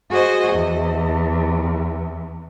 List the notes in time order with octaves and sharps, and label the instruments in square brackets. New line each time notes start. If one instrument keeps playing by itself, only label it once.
[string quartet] F#4 G#4 C5 D#5
E2